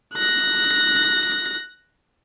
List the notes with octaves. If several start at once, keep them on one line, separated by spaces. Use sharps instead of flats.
F#6 A#6